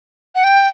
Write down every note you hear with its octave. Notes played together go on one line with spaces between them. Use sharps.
F#5
G5